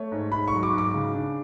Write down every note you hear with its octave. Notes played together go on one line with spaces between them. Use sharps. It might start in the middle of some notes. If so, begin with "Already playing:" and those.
Already playing: A3 C#5
G#2
G#2 B5
C#6
F#3
D6
G#2
D6
C#3
D4